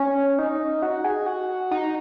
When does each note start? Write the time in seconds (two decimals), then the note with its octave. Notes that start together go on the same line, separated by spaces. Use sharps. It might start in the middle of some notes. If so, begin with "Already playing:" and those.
Already playing: C#4
0.39 D#4
0.82 F#4
1.04 G#4
1.26 F#4
1.71 D#4